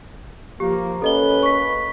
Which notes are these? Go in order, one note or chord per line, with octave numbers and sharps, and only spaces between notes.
F3 A#3 G4
A#3 C#4 A4 B4 D#5 G7
C#6 B6